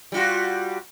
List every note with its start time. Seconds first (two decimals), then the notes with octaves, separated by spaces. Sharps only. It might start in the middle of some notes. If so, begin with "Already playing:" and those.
0.12 G3 F4 F#4